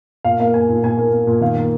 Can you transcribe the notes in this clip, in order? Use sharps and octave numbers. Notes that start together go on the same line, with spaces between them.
A#2 F5
A#3 F5
A#3 G#5
A#2
A#2 G#5
A#3
A#3
A#2
D#3 F5
A#3